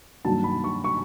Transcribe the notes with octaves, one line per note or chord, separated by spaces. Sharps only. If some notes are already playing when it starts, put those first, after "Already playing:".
G2 D#3 F#3 A#3 D4 A5
B5
C#6
C#6